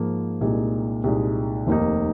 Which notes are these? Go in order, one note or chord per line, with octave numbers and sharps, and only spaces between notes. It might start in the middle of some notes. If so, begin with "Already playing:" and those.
Already playing: G#2 F3 A#3
C2 A#2 G#3 D#4
C2 A#2 G#3 D#4
F1 D#2 D#3 A#3 D#4